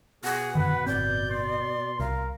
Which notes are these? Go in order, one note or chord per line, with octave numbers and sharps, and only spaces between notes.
B2 G#4 F#5
F#2 D3 D#3 B4
G1 A2 C4 D5 G6
C6
C2 A#4 F5